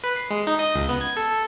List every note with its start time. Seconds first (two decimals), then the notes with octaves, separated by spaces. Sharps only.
0.04 B4
0.16 C7
0.30 G#3
0.47 D#4
0.59 D#5
0.76 C#2
0.89 B3
1.01 G#6
1.17 A4
1.31 A4